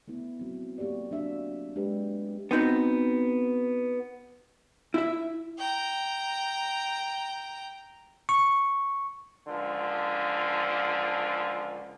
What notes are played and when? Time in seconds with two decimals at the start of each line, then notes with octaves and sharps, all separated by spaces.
0.08 A3 B3 E4
0.40 F#3 C4
0.78 A3 A#3 G4 C#5 D5
1.11 F#3 D4 E5
1.76 G#3 D4 G4 B4
2.51 B3 C4 D#4 F#4
4.94 E4 E5
5.59 G5 A#5
8.29 C#6
9.47 C#2 D3 F3